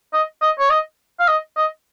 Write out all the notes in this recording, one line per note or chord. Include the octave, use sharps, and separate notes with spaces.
D#5
D#5
C#5
D#5
F5
D#5
D#5